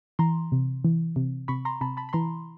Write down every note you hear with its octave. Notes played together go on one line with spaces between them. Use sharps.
E3 A#5 C6
C3
E3
C3
C3 B5 C#6
A#5 C6
C3 A5 B5
A5 B5
B5
E3 A#5 C6